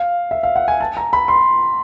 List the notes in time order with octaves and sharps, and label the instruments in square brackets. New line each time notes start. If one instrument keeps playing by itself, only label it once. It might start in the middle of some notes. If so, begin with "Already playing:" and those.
Already playing: [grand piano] F5
E5
F5
F#5
G#5
A5
A#5
B5
C6